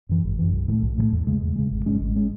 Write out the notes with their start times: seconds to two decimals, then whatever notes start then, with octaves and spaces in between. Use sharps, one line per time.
0.09 F#2 E3
0.24 G#1
0.39 F#2 E3
0.53 B1
0.68 A2 E3
0.72 A3
0.83 B1
0.98 A2 E3
1.02 A3
1.12 E2
1.27 C#3 G#3
1.41 E2
1.56 C#3 G#3
1.71 G#1
1.85 G#2 G#3 C#4
2.00 G#1
2.16 G#3 C#4